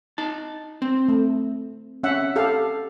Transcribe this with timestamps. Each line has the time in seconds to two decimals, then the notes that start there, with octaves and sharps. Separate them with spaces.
0.18 D#4 A5
0.82 C4
1.08 A3
2.03 C#4 E5 F#5
2.36 G4 A4 F5